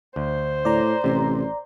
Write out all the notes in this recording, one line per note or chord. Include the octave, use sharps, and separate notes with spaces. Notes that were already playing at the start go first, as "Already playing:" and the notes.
D2 C5
A2 D5 A#5
A1 C3